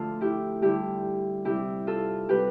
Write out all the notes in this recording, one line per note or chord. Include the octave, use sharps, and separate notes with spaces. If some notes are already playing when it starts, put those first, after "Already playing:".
Already playing: D3 F3 A3 F4 A4
E4 G4
D3 G3 E4 G4
C3 G3 E4 G4
F4 A4
C3 G3 G4 B4